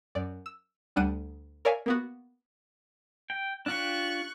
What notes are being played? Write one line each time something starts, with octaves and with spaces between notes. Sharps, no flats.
F#2 D5
E6
D2 G3 D4 F#5 D#7
A#4 C#5 D5 E5 F5 G#5
A#3 B3 F#4
G5
D4 F4 G4 C#6 F#6